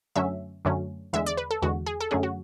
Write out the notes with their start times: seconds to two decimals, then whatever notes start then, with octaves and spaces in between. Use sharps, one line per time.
0.16 F#2 D3 F#3 A3 C#4 E5
0.65 F#2 D3 F#3 A3 C#4
1.13 E2 D3 G#3 E5
1.26 D5
1.37 B4
1.51 A4
1.62 E2 D3 G#3 F#4
1.86 G#4
2.00 A4
2.11 F#2 D3 F#3 A3 C#4 G#4
2.23 F#4